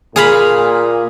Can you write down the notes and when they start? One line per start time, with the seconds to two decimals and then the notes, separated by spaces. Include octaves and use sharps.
0.16 A#2 G#4 F5 B5